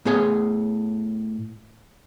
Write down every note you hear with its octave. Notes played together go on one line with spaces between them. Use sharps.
A2 B3 G#4 C#5 G#5 C6